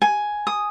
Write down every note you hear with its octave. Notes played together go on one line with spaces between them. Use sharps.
G#5
D#6